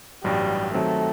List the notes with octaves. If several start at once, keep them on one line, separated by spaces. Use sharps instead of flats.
A1 G2 F#3 G3
D#3 F#3 A3 C4